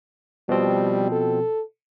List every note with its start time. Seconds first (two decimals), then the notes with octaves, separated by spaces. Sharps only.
0.49 B2 F3 G3 C4
1.12 A4